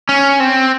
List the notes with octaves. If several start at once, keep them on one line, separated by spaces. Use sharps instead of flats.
C#4
C4